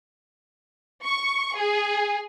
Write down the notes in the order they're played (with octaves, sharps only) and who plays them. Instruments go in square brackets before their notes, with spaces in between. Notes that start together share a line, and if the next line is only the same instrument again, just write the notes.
[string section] C#6
G#4